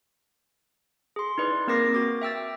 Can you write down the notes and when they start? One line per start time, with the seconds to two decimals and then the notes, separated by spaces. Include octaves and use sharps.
1.16 G#4 C6
1.38 D#4 E4 B4 D5
1.67 A#3 C4 A#4 D6 A#6 C7
1.94 F#4 D6
2.21 E5 G5 E6 A6